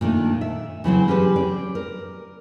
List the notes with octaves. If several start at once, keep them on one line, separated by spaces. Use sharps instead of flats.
A#2 D#3 A3 D4
E5
C#3 E3 F#3 C4
C#4 G4 G#4 B4
D5
A#4